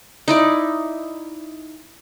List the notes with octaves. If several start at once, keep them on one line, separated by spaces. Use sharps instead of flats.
D#4 E4 D5